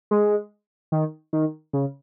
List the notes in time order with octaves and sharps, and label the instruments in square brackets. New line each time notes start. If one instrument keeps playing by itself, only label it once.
[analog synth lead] G#3
D#3
D#3
C#3